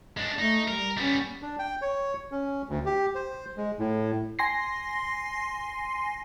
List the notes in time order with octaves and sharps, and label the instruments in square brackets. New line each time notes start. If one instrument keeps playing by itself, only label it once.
[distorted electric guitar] G#3 D4
[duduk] A3 [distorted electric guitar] D#4
[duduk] G3 [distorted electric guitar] A#4
[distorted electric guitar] G3 B3 [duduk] C#4
[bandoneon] D4
G5
C#5
C#4
D2
G4
C5
G#3
A2
[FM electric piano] G#5 C6 A#6 C7